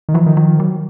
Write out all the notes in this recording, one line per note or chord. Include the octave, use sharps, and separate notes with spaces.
D#3
E3 F3
D#3
F3
F#3